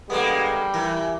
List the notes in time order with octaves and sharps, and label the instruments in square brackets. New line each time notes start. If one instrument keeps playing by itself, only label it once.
[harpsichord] D3 B3 [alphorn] G3 [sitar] G#3 A#3
[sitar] E3 [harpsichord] A#4